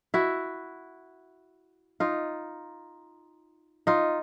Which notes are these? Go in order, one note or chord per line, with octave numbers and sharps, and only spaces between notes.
E4 F#4
D#4 F4
D#4 F4